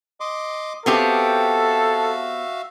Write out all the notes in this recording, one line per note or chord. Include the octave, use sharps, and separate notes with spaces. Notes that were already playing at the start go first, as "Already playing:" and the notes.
D#5 C6 D6
B3 C4 F#4 G4 A4 E5 F5